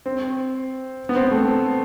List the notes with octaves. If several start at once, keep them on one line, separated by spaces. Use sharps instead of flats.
C4
B3
C4
A3